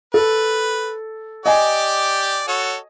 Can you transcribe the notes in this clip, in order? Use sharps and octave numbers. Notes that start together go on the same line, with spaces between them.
A4 B4
G4 D5 D#5 G#5
F#4 A4 C#5